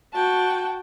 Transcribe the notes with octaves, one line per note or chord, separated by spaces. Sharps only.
F#4 G5 A5